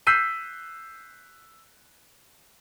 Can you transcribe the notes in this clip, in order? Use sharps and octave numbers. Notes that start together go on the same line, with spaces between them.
E6 F#6 G6 B6 C7 D#7